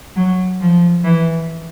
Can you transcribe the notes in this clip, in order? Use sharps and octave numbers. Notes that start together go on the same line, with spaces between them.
F#3
F3
E3